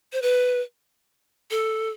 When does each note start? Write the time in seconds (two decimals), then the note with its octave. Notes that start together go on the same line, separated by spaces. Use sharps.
0.13 C5
0.22 B4
1.51 A4